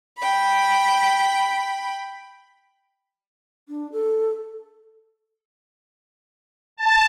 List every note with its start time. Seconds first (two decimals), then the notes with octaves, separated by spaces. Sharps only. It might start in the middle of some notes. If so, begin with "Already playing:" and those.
0.18 G5 B5
3.69 D4
3.92 A4
6.77 A5